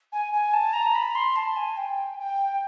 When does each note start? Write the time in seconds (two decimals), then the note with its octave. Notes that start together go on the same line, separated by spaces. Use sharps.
0.12 G#5
0.33 G#5
0.54 A5
0.73 A#5
0.95 B5
1.15 C6
1.36 A5
1.56 G#5
1.77 G5
2.19 G5